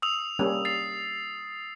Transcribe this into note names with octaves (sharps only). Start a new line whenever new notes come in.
D#6 E6 F7
G3 A#3 C#4
A6 C7 F7